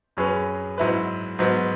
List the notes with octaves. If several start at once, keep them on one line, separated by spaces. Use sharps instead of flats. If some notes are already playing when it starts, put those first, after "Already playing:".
F#2 F#3 C#4 G#4 B4
G#2 F#3 E4 B4
G#2 F#3 B3